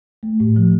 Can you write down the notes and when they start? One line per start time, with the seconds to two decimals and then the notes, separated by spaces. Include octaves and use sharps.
0.23 A3
0.40 A2
0.56 F3